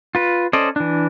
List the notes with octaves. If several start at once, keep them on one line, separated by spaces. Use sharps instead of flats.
F4 B4
C#4 A4 C5 D5 D#5
E3 D4